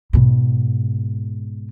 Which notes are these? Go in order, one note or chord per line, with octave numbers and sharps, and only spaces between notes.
G#2 B2